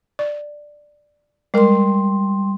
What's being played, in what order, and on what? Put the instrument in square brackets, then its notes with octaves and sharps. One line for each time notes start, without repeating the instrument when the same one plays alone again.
[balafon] D5
[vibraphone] G3 C6 [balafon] G#3 A#4